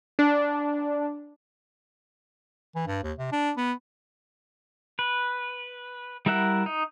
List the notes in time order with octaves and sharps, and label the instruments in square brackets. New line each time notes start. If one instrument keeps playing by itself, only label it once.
[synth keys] D4
[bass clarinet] E3
G2
D#2
C3
D4
B3
[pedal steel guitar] B4
G3 E4 A#4 E5 F#5
D#4